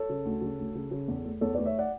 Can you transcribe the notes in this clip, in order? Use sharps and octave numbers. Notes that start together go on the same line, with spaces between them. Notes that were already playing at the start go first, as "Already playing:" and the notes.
Already playing: A4 C#5
C#3
D2
C#3
D2
C#3
C#3
E2
A3
E2 A4 C#5
A3 B4 D5
C#5 E5
D5 F#5